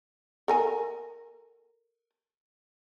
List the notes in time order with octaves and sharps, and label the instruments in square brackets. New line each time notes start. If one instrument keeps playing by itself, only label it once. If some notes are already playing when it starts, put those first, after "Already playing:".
[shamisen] A4 A#4 G#5